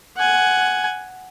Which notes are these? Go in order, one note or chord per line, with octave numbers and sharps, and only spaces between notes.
F#5 G#5